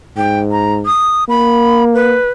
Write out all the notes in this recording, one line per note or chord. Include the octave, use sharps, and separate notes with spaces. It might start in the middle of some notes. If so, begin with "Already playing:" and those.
G#2 G5
A#5
D#6
A#3 B5
B4